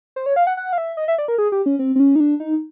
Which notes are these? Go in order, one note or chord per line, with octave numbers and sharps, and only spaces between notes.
C5
C#5
F5
F#5
F#5
F5
E5
D#5
E5
D5
A#4
G#4
G4
C#4
C4
C4
C#4
D#4
D4
D#4